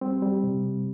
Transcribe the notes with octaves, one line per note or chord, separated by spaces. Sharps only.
G3 C4
G3
C3